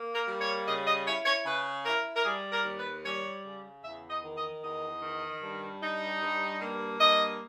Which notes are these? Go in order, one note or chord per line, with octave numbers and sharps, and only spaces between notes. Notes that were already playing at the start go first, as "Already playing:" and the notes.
Already playing: A#3
A#4
G3
C#5
C#3 D#5
D#5
E4 C#5
C#5
C#3 B4
E4 A#4
A#4
G3 G#4
A#4
D#2
B4
G3 C#5
C#3
E2 E5
D#5
D#3
D#5
E2 D#5
D#3
G2
D#4
G2
A#3
G2 D#5